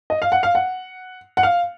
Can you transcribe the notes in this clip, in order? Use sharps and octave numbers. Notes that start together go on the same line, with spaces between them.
D#5
F5
F#5
F5
F#5
F#5
F5